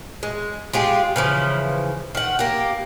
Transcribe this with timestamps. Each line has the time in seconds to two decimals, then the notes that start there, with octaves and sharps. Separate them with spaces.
0.23 G#3
0.73 G#3 F4 G4 G#4
1.16 C#3 E3 F3
2.15 D#3 F#5
2.39 A#3 G4